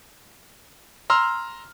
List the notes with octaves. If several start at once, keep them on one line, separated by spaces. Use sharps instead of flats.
A#5 C6 E6 F6